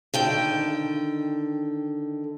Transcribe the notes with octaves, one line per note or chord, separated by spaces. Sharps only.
D3 D#3 G5